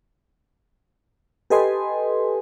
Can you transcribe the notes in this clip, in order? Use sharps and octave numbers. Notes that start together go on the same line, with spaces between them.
G4 A4 B4 D#5 G#5 C6